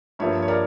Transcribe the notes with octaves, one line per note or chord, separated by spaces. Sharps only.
G2 F3 A#3 C#5 E5
C#5
A#4 D5